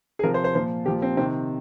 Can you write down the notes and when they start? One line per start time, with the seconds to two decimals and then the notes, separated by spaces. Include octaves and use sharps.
0.19 G#4
0.23 C3 F3 A#4
0.34 C5
0.44 C5
0.55 A#2 F3 C5
0.86 A#2 F3 G4
1.02 C4
1.17 C3 D#3 C4